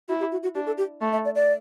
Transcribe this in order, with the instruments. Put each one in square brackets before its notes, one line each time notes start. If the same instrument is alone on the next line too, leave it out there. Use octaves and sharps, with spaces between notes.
[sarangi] E4 [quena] F#4
[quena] G4
F#4
F#4
[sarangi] D4 [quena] G4
[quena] A4
G4
[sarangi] A3
[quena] E5
D5
D5